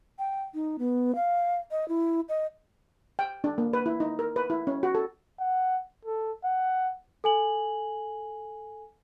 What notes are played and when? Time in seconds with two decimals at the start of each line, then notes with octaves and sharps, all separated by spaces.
0.19 G5
0.54 D#4
0.79 B3
1.15 F5
1.71 D#5
1.89 E4
2.29 D#5
3.19 G5
3.44 D4
3.58 A#3
3.73 B4
3.86 E4
4.00 D#4
4.19 A#4
4.36 B4
4.50 E4
4.67 C#4
4.83 F#4
4.95 A4
5.40 F#5
6.05 A4
6.45 F#5
7.24 A4 G#5 F#7